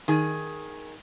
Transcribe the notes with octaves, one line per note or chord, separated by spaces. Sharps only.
D#3 G#4